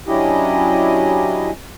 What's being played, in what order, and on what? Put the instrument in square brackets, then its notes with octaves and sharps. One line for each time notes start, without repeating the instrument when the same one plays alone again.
[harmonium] F#3 C#4 D4 E4 G4 D#5